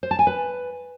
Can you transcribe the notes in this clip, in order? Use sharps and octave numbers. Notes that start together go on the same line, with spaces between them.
C5
A5
G#5
B4